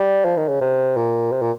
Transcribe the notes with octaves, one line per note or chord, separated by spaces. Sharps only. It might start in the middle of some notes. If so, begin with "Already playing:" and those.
Already playing: G3
F3
D#3
C#3
C3
A#2
C3
A#2